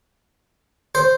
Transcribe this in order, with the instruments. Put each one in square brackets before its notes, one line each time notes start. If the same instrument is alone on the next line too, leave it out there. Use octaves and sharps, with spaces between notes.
[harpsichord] C5